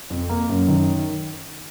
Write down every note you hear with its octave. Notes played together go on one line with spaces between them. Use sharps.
F2
A#3
F#2
D#3